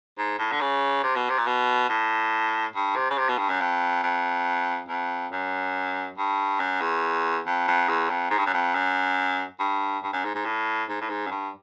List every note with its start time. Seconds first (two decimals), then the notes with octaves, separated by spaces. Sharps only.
0.18 G#2
0.39 A2
0.52 D3
0.61 C#3
1.03 C3
1.15 B2
1.29 C3
1.38 A#2
1.47 B2
1.89 A2
2.75 G2
2.96 C3
3.10 C#3
3.18 C3
3.28 B2
3.38 G2
3.49 F#2
3.61 F2
4.03 F2
4.88 F2
5.32 F#2
6.18 G2
6.59 F#2
6.81 E2
7.46 F2
7.68 F2
7.89 E2
8.10 F2
8.31 G#2
8.38 G2
8.46 F#2
8.53 F2
8.75 F#2
9.60 G2
10.03 G2
10.13 F#2
10.24 G#2
10.35 G#2
10.45 A2
10.89 G#2
11.01 A2
11.10 G#2
11.26 F#2
11.31 G2